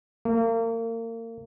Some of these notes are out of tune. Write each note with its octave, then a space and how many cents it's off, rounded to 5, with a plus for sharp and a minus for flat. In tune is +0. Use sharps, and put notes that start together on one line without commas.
A#3 -35